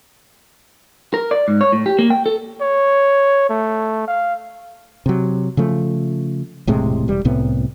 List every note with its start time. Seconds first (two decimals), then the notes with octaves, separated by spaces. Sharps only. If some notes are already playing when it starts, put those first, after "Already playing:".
1.14 A#4
1.31 D5
1.48 G#2
1.61 C#5
1.72 A2
1.86 G4
1.99 A#3
2.10 G5
2.26 A4
2.61 C#5
3.49 A3
4.08 F5
5.06 C3 F#3
5.57 C#3 F3 A3
6.67 E1 A2 C3 G#3
7.08 E1 G3
7.25 C2 A2 C3 B3